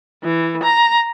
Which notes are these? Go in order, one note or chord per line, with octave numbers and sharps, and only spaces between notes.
E3
A#5